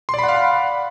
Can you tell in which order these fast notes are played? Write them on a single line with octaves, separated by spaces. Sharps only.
C6 D5 B5 F#5 F5